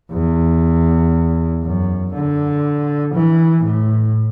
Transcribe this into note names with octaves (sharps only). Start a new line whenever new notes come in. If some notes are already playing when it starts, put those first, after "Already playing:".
E2
F#2
D3
E3
A2